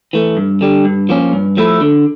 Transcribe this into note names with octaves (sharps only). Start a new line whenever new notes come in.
E3 A3
G2
D3 G3
G2
F3 A#3 C#4
G2
F3 A3 E4
D3